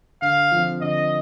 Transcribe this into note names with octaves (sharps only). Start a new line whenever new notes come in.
D3 F5
F3 C4
D3 D#5